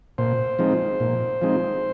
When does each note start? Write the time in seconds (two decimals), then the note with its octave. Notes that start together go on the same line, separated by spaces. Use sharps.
0.18 A#2 C5
0.59 F3 G#3 C4 D#4
1.00 A#2
1.42 F3 G#3 C4 D#4